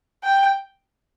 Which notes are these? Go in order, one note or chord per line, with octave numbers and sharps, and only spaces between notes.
G5